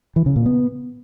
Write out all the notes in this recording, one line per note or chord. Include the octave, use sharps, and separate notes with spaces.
E3
C#3
A#2
B3